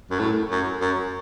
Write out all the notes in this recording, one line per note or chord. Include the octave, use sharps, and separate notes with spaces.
F#2
A2
F#2
F#2